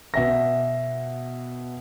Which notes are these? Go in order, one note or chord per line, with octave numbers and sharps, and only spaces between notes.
B2 E5 A#6